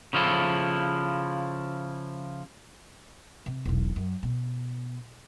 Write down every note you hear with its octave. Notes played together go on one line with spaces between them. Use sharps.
C#3 F3 E4 A4
C3
E1 B1
F#2
B2